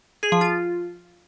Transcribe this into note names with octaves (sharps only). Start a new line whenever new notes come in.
G#4
F3
F4